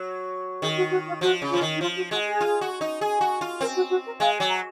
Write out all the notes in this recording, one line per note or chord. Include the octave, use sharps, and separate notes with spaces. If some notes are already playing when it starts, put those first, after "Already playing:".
Already playing: F#3
D#3 G#4
F#4
F#4
F4
F3 F#4
C#3
F3 F4
D#3
D#4
F3 F4
F#4
G#3 F#4
G#4
F4
F#4
D#4
G#4
F#4
F4
C4 A#4
F#4
F#4
A#4
G#3 F5 G#5
F#3
F#5 A#5